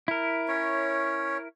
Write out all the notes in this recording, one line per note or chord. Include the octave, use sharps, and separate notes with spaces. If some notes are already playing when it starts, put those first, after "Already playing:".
E4 A#4
C#4 C#5